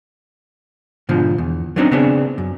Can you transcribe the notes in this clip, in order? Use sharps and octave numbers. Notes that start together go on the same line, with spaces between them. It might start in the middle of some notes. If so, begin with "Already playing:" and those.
G#2 B2 D3 F3
E2
F#3 B3 C4 D4 D#4
C#3 B3 C4 D4 G#4
F#2